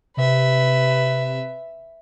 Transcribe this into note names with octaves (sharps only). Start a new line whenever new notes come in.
C3 B4 E5